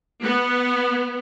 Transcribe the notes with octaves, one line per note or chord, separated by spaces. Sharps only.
B3